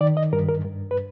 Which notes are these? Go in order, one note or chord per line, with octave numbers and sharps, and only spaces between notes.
D#3 D5
D#5
G2 A#4
A#4
G2
B4